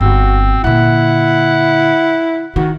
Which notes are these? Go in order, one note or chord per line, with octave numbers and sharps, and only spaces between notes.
G1 C4 F#4
A#2 D3 E4 F#5
D#3 F#4